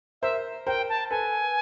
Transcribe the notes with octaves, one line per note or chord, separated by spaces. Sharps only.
A#4 C5 E5
A#4 C5 G5
A5
A4 B4 G#5